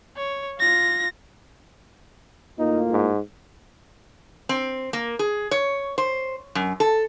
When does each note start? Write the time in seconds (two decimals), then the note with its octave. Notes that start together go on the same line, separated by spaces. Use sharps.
0.17 C#5
0.60 F4 A#6
2.59 A2 A#3 D#4 F4
2.91 G#2
4.49 C4
4.93 A#3
5.19 G#4
5.51 C#5
5.98 C5
6.55 F#2
6.80 A4